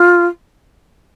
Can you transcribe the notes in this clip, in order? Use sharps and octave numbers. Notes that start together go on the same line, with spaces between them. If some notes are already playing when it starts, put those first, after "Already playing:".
Already playing: F4